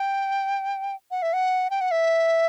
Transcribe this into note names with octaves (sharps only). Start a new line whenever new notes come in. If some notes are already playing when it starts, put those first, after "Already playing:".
Already playing: G5
F#5
E5
F#5
G5
F#5
E5